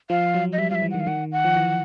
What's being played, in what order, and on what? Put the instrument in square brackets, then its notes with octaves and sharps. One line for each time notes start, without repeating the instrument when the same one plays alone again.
[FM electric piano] F3 [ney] F5
[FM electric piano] F#3
[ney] D#5
[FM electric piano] G3 [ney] E5
[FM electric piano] F3 [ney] F5
[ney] E5
[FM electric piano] E3
[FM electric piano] D#3 [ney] F#5
[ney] F5
[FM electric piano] D#3 [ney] F#5
[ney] F#5
[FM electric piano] F3
E3